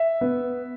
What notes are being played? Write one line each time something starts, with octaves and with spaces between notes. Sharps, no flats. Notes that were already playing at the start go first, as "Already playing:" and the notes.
Already playing: E5
B3